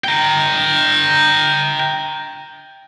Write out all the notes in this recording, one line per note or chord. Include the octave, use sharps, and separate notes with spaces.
G5 A#5